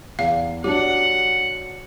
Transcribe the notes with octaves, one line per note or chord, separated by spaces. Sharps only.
E2 F5
F#3 D4 G4 F#5